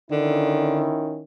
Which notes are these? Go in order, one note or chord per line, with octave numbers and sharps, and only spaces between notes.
D3 D#3 C#4 E4